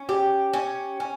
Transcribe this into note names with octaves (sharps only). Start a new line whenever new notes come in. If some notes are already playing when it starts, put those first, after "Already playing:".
Already playing: C#4
G4
C#4
C#4